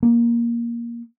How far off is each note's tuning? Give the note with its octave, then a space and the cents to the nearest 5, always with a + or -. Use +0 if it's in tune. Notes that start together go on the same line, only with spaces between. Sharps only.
A#3 +10